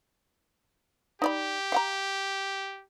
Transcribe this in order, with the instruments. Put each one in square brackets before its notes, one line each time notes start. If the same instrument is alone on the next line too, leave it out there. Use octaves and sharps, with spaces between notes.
[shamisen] D#4 D5 B5 [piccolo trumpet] G4
[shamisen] F5 F#5 A#5